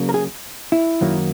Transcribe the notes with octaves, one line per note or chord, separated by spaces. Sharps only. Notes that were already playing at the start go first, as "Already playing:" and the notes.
Already playing: C#3 F#3 A#3
A#4
G#4
E4
F#2 D#3 F#3 A#3